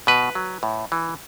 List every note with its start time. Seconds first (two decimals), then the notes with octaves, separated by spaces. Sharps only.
0.07 B2 B4
0.35 F#3
0.63 A2
0.92 E3